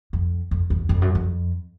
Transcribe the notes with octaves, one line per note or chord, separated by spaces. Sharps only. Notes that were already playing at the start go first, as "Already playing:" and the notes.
F2
F2
E2
F2
F#2
F2